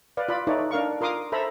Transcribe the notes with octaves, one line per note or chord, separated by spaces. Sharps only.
B4 D5 F5
F4 D5 B5
D#4 E4 A4 B4 C#5 D5
D4 A#4 F5 C#6
F4 A#4 C6 D6 D#6
A4 C5 E5 A#5 B5